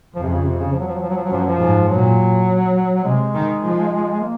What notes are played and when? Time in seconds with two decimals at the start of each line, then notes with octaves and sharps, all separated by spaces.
0.15 F2 F3
0.23 C3
0.29 C#3
0.45 C3
0.58 C#3
0.73 F3
0.80 F#3
0.88 F3
0.95 F#3
1.03 F3
1.09 F#3
1.17 F3
1.25 F#3
1.31 F#2 F3
1.39 F#3
1.46 F3
1.60 G#2
1.89 A#2 F#3
3.05 C3 G#3
3.34 D#3
3.63 F3
4.21 A#3